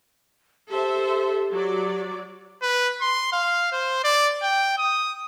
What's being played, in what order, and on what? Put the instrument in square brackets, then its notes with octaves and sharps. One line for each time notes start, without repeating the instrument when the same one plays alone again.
[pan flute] G4 [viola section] A4 C5 E5
[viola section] F#3 D5
[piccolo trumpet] B4
C6
F5
C5
D5
G5
D#6